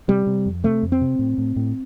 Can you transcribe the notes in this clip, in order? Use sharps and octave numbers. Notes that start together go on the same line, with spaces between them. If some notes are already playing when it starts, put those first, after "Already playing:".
C3 G3
C3
F2
C3 A3
F2
C4
C3
A2
A2
A2